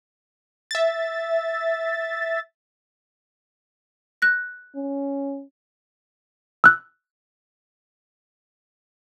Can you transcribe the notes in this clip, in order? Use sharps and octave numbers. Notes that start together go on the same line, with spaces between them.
E5 A6
F#6 A#6
C#4
E6 F#6